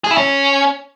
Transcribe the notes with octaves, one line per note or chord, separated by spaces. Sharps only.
G#4
E4
C#4